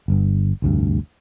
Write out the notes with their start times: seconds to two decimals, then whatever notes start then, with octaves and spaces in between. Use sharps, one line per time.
0.08 G1 G2
0.62 F1 D2 G2